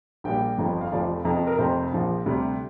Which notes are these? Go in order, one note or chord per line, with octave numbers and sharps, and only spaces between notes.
A#1 A#2 G3 G5
G1 F2 F3
F5
F1 F2 F3 D5
F2 C3 F3
A#4
F1 F2 C3 C5
A#1 A#2 F3
D2 C3 G3